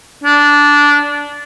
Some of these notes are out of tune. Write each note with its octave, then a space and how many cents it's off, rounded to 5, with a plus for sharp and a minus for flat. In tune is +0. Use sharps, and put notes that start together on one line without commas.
D4 -15